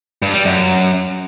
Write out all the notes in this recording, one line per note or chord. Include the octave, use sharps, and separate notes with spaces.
G2
G3
F#2